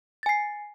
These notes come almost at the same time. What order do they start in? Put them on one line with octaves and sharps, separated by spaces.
A6 G#5 C7